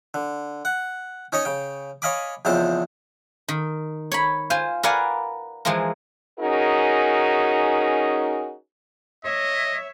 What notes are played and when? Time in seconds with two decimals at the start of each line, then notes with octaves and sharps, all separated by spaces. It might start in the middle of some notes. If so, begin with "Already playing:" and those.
0.14 D3
0.65 F#5
1.32 C#4 D#4 C#5 D#5
1.45 C#3 G5
2.02 C#5 D#5 F5 G#5 B5 D6
2.45 E2 C#3 F3 G#3 C4 A5
3.48 D#3
4.12 C#5 B5
4.50 F4 C5 G#5
4.83 A#4 B4 D5 F5 F#5 G#5
5.65 E3 F3 G#3 F4 A#4
6.40 C#4 D#4 F#4 G#4 A#4
9.24 C#5 D#5 E5